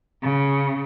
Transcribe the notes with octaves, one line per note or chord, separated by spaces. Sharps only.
C#3